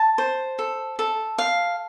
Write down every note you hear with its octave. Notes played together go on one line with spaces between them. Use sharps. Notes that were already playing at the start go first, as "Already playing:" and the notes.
Already playing: A5
C5
A4
A4
F5